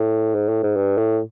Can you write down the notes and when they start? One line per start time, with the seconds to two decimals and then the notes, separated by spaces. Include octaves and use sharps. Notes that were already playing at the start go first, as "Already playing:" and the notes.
Already playing: A2
0.35 G#2
0.49 A2
0.63 G#2
0.76 G2
0.98 A2